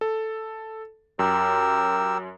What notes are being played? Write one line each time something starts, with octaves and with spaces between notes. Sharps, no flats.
A4
F#2 G4 A#4 E6